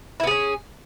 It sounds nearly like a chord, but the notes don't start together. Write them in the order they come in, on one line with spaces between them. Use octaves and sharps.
E4 B3 G#4 C#4